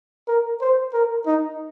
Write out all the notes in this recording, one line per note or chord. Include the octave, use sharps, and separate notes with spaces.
A#4
C5
A#4
D#4